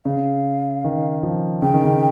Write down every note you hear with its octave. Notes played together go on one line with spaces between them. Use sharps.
C#3 F5
D#3
F3
C#3 G5
D#3
C#3